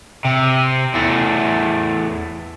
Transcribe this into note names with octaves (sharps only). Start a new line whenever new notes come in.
C3
E2 A3